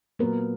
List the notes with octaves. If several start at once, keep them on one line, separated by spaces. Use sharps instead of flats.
A#2 F#3 A#3 B3 A#4